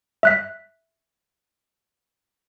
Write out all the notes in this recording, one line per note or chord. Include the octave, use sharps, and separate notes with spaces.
E5 F#6 B6